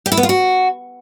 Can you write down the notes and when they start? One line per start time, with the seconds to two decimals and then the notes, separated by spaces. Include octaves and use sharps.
0.06 G4
0.12 E4
0.17 B3
0.23 F4
0.29 F#4